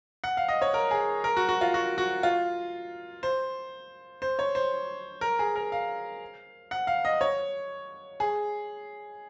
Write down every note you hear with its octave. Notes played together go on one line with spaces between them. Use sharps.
F#5
F5
D#5
C#5
A#4
G#4
A#4
F#4
F#4
F4
F#4
F#4
F4
C5
C5
C#5
C5
A#4
G#4
A#4
F5
F#5
F5
D#5
C#5
G#4